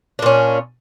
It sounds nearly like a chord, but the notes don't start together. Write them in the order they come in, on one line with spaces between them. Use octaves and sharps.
D4 A#2 C#4